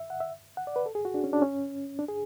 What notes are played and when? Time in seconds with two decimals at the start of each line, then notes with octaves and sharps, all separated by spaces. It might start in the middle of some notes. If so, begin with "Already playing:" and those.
Already playing: E5
0.10 F#5
0.20 E5
0.57 F#5
0.67 D5
0.76 B4
0.86 A4
0.95 G#4
1.05 F#4
1.14 D4
1.24 C#4
1.33 D4
1.42 C#4
1.99 D4
2.08 G#4